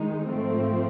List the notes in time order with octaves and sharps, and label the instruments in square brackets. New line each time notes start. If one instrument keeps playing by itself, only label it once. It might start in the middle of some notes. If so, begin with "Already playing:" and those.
Already playing: [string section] D#3 G#3 D#4
G#2 F3 A3 C4